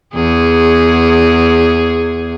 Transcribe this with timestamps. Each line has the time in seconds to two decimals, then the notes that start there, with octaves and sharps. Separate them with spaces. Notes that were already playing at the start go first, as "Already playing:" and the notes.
0.14 E2 G#4